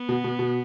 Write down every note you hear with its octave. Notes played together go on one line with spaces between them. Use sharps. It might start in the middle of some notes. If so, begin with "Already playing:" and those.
Already playing: B3
B2
B2
B2